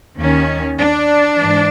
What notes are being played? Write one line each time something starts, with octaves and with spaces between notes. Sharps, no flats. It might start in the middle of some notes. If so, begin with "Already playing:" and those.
D#2 D#3 C#4
D4
G#2 E3